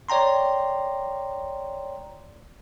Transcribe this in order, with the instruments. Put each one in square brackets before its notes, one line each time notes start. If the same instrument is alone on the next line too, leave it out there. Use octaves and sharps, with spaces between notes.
[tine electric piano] C#5 D5 G5 A#5 C6